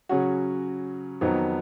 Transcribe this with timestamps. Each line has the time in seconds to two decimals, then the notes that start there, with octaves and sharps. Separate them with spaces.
0.09 C#3 F#3 C#4 F#4
1.21 F2 D#3 F#3 B3 D#4